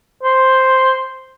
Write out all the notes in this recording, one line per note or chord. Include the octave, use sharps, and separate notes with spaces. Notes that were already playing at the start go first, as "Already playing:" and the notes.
C5